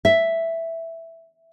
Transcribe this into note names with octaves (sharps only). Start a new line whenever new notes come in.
E5